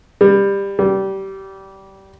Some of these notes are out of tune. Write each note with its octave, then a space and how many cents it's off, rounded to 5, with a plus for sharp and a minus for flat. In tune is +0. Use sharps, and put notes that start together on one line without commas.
G3 +20
G3 -20